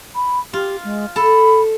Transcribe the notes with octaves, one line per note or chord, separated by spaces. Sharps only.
B5
F4 G4
G#3
A4 B5